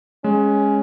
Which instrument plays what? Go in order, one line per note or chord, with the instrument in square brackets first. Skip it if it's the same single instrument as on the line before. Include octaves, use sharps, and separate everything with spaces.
[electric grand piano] G#3 [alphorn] C#4